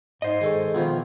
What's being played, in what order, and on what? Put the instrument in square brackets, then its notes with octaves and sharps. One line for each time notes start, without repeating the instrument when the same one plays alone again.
[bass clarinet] G#2 [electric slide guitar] C5 D#5
[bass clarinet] D#3 [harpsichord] G#3 A4 C#6
[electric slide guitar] B2 [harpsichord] D#3 F3 E4 [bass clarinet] F4